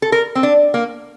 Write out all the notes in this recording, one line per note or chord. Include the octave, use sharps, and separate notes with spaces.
A4
A#4
C4
D4
A#3